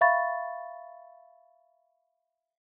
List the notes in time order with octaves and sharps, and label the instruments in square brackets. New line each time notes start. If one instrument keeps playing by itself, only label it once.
[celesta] E5 F5 B5 C#6 A6